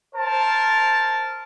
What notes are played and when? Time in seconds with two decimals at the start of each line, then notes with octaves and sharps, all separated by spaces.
0.15 A#4 C5 A5